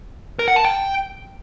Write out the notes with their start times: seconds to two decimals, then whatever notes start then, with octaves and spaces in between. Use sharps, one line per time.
0.39 A#4
0.48 F#5
0.56 A5
0.65 G5